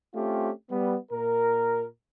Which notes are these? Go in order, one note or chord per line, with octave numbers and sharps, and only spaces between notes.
A3 C4 C#4 F4 G4
G3 B3
A#2 A#4